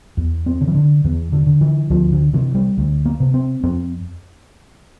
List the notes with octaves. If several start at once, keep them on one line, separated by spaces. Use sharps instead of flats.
E2
C4
D3
E3
D3
E2 E3
D3
D3
E3
D2 F3
D3
C3 E3
G3
D2
A#3
C3
C4
F2 C4